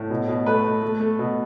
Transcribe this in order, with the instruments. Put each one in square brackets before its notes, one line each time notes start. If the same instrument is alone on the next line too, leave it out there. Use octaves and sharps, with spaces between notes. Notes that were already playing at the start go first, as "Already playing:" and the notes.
Already playing: [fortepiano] A2
B2
B2
A3 B4
A3
A3
A3
B2